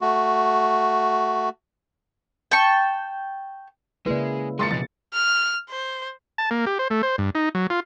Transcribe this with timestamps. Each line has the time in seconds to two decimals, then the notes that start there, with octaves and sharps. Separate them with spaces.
0.01 A3 F#4
2.51 G5 A5 C#6
4.06 C#3 G#3 A#3 E4 B4 D5
4.59 G#3 G#4 A#4 C6 A6 C#7
4.71 F2 B2 A6
5.14 F6
5.70 C5
6.38 A5
6.51 A#3
6.66 G4
6.79 C5
6.90 A3
7.03 C5
7.18 G2
7.35 D#4
7.55 F#3
7.70 F4